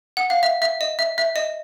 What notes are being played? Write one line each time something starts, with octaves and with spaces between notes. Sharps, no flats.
F#5
F5
E5
E5
D#5
E5
E5
D#5